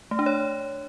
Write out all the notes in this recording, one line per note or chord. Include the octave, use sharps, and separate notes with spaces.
A3
D4
C#5